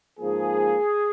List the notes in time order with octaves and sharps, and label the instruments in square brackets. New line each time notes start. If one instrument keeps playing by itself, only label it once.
[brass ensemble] G#2 F3 A#3 G#4